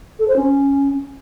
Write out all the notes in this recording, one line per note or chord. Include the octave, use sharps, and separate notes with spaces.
A4
C5
C#4